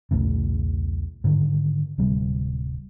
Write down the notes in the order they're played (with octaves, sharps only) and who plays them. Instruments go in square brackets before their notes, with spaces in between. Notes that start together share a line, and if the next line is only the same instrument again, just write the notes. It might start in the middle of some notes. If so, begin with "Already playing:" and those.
[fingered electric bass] B1 E2 A2 C#3
G#2 D3 D#3
D1 C3 G3